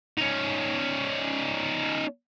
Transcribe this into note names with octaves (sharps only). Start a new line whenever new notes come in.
C#4 D#4